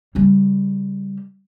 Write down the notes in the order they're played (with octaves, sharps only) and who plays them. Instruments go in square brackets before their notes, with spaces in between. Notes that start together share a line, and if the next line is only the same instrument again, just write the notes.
[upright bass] C#3 G3